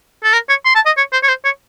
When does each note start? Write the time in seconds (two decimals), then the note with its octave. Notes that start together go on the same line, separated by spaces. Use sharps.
0.24 A4
0.33 A#4
0.49 C#5
0.65 C6
0.75 A5
0.86 D#5
0.97 C#5
1.13 C5
1.23 C#5
1.28 C5
1.45 C#5